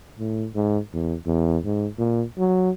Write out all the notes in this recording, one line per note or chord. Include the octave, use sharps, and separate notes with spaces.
A2
G#2
E2
E2
G#2
A#2
F#3